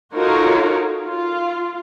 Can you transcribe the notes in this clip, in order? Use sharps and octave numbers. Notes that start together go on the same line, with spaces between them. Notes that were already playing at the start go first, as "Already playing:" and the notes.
D#4 F4 F#4 A4 A#4 C#5
F4